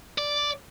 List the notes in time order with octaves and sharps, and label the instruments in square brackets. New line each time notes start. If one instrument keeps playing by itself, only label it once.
[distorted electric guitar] D5